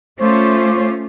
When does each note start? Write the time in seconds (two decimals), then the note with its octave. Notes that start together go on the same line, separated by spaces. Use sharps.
0.19 A3 C#4 F4 C5 C#6 D6